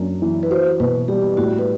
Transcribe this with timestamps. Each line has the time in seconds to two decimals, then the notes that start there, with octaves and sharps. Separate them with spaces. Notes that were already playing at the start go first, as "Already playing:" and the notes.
Already playing: F#2 D4
0.22 E3
0.43 B4
0.50 F#4 C5
0.80 B2 B4
1.08 G3 G4
1.37 A2 F#4
1.59 B4